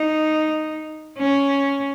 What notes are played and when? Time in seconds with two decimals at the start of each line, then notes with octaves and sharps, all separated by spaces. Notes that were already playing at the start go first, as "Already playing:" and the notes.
Already playing: D#4
1.19 C#4